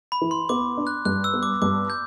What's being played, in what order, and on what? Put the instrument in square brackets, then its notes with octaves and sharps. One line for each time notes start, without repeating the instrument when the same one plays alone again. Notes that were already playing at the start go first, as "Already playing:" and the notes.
[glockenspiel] B5
[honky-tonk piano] E3
[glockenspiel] C6
[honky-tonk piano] B3 [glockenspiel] D6
[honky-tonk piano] D4
[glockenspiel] F#6
[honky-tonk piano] G2 [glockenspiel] F#6
[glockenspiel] E6
[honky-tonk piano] B3
[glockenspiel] D6
[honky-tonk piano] G2 [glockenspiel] D6
[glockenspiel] G6